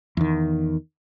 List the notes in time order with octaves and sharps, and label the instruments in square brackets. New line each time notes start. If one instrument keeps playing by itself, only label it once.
[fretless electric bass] E2 D#3